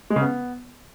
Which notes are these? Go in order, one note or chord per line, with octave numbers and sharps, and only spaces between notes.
G#3
C#3
B3